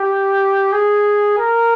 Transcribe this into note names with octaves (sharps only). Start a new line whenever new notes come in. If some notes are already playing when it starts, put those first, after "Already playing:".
Already playing: G4
G#4
A#4